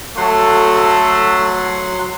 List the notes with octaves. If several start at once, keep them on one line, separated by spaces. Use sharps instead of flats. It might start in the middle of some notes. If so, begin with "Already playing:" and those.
F#3 A3 F#4 A4 F#5 C6